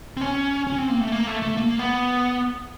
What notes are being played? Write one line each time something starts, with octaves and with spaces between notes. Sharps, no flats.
C4
C#4
C#4
C4
A#3
A3
A#3
A3
A3
A#3
B3